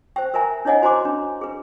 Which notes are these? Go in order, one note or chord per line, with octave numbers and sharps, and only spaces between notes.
C5 G5
A#4 B4 E5 G#5 A#5
D4 E4 C#5 D#5 F#5 G#5
F#4 C5 G#5 A#5 C6 D6
D4
G#4 B4